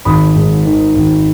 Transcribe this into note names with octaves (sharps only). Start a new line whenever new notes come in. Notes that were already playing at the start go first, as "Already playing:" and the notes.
G#1 B5 D#6
G#2
D#3
G#1